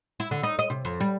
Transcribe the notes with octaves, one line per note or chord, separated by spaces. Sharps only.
E4
D3
D#4
D#5
C3
F2
G3